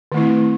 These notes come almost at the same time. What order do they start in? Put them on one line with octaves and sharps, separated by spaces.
D#3 A3 E4 C4